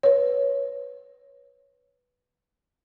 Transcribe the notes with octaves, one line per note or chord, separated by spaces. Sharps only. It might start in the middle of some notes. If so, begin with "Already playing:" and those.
B4 C#5